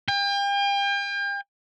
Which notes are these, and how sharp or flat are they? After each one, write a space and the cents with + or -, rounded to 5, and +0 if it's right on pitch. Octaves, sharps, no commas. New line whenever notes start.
G5 +40